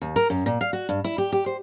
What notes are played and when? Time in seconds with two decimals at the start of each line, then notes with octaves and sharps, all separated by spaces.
0.02 D#2
0.16 A#4
0.30 F#2
0.46 A#2
0.61 F5
0.73 F#4
0.89 G2
1.04 E4
1.18 G4
1.32 G4
1.46 C5